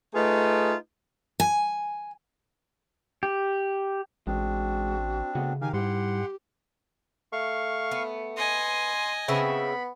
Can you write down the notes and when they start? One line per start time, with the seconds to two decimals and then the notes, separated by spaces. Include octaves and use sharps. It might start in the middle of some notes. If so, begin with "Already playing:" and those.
0.14 A3 D#4 F4 G#4 B4
1.40 G#5
3.23 G4
4.27 A1 G#3 C4 D4 F#4
5.35 C#3 A3 B3 F#4
5.61 D#3 G4 A#4 F5 G#5
5.73 G#2 G3 E4 G4 F#5 C6
7.33 A3 F5 C#6
7.91 B3
8.37 D#5 G#5 C6
9.28 C#3 B3 C4 E5 B5